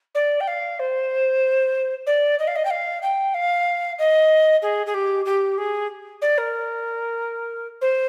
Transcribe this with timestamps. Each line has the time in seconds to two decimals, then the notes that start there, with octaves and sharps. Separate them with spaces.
0.15 D5
0.41 G5
0.48 F5
0.79 C5
2.07 D5
2.39 D#5
2.47 F5
2.56 D#5
2.65 G5
2.70 F5
3.02 G5
3.34 F5
3.99 D#5
4.62 G#4
4.86 G#4
4.94 G4
5.25 G4
5.58 G#4
6.22 D5
6.38 A#4
7.81 C5